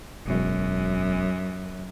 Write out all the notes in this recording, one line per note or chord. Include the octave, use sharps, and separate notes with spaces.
E1 F#2